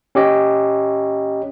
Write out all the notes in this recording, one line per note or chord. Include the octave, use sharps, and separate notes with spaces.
C#4 G4 C#5 D#5